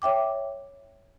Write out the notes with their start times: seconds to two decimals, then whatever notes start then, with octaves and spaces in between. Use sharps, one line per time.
0.02 C#5 E5 G5 D6